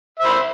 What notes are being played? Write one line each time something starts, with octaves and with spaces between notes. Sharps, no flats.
C5 E5 B5